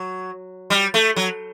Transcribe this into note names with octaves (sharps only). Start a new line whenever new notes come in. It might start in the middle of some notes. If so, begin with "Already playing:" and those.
Already playing: F#3
G3
A3
F#3